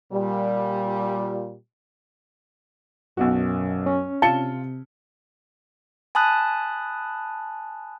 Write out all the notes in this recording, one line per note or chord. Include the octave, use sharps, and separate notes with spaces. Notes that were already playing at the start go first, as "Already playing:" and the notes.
A#2 G3
B1 F#2 B2 F#4
C#4
C3 F4 A5 C#7 G7
G#5 A5 B5 D#6 F#6